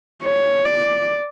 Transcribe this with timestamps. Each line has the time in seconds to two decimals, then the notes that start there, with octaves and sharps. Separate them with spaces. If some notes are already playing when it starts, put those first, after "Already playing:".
0.23 C#5
0.65 D5